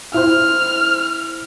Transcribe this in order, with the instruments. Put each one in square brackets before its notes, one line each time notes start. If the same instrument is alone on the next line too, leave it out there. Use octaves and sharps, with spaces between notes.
[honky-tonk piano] E4 C5 [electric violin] F6